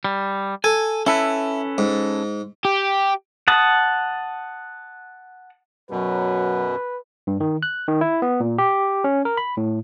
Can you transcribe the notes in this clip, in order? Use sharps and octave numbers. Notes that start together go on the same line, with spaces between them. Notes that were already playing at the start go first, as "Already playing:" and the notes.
G3
A4 G#5
C#4 E4 A4 B4
G#2
G4
F#5 A5 D#6
F#2 B2 F#3 B4
G2
D#3
F#6
D#3
E4
B3
A#2
G4
C#4
A#4
B5
A2